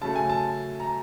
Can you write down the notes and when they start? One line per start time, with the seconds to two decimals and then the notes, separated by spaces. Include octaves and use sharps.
0.01 C#3 F#3 A3 A5
0.16 G#5
0.30 A5
0.80 A#5